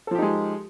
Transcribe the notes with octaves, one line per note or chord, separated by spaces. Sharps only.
F3 G#3 D#4 G4 A4